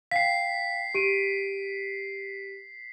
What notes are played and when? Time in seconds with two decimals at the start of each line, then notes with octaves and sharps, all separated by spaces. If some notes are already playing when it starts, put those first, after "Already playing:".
0.11 F5 G5 B6 C7
0.94 G4 D7 D#7